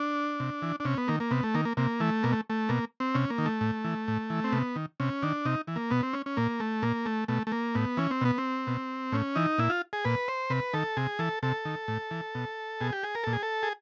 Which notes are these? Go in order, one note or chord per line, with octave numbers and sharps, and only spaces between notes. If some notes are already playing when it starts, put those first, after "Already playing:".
Already playing: D4
C3
E3
D4
C3 C#4
B3
D#3 A#3
A#3
C3 B3
A3
D#3 A#3
A#3
C3 A#3
E3 A3
B2 A#3
A3
A3
B2 A#3
C4
C3 C#4
A#3
D#3
A3
A2
E3
A2
E3
C4
C3 B3
D#3
C3 C#4
D#3 D4
C3 D#4
E3
A#3
B2 B3
C4
C#4
C#4
A#2 A#3
A3
A#2 A#3
A3
B2 A3
A3
A#3
A2 B3
E3 C#4
C4
B2 B3
C4
B2
A2 C#4
E3 D#4
A#2 E4
F4
G#4
A#2 B4
C5
C3 B4
D#3 A4
C3 G#4
E3 A4
C3 A4
D#3
A2
E3
B2
B2 G#4
G4
G#4
A#4
A#2 A4
G#4
A4
G#4